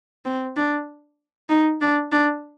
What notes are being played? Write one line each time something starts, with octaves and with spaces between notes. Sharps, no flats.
C4
D4
D#4
D4
D4